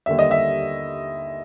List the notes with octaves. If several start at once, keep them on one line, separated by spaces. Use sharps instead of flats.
D#2 D3 G3 E5
D#5
E5